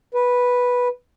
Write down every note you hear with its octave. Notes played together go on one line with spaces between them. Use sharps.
B4